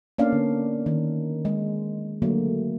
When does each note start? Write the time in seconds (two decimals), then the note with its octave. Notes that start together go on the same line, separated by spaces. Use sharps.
0.18 A#3 B3 C#4 D4 D5 F5
0.32 D3
0.86 D#3
1.45 G#3
2.22 D3 F#3 A3 A#3